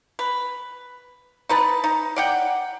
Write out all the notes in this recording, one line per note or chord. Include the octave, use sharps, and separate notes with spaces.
B4
D#4 B4 A5
D#4
D5 F#5 G5